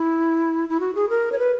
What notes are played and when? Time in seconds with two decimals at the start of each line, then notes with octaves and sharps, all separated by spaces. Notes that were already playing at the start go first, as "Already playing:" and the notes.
Already playing: E4
0.69 E4
0.80 F#4
0.95 G#4
1.09 A#4
1.32 C#5
1.39 B4